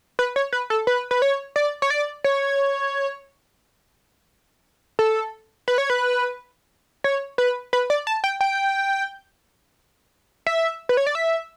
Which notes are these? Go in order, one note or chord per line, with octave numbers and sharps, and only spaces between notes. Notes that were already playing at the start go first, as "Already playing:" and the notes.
B4
C#5
B4
A4
B4
B4
C#5
D5
C#5
D5
C#5
A4
B4
C#5
B4
C#5
B4
B4
D5
A5
G5
G5
E5
B4
C#5
D5
E5